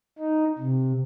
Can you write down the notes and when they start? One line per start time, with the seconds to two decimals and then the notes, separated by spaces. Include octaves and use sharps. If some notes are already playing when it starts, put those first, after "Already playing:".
0.19 D#4
0.59 C3